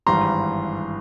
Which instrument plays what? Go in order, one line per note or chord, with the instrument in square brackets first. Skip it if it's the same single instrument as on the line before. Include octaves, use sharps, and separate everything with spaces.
[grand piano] G#1 G2 E3 G3 A#5 C6